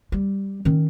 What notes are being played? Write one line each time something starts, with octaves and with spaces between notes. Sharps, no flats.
G3
D#3 C#4